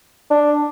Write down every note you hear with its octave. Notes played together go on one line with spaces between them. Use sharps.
D4